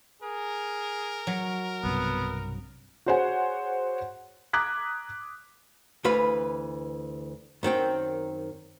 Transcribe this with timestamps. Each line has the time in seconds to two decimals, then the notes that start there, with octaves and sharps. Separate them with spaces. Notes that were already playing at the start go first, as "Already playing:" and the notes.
0.23 G#4 A#4
1.27 F#3
1.83 B1 G2 C3 B3
3.06 F#4 G#4 C5 C#5 F#5 G#5
4.53 A#5 D6 D#6 F#6 G#6 B6
6.04 D2 E3 B4 F5 B5
7.63 F#2 D#3 C4 G5